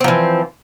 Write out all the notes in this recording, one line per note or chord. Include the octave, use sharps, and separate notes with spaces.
E3 F3 C4